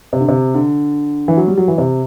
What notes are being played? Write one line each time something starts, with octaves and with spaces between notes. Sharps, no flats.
C3
D3
C3
D3
E3
F#3
G3
F#3
E3
C3